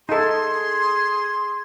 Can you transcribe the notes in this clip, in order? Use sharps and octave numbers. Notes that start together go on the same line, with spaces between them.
D#4 G#4 A4 C6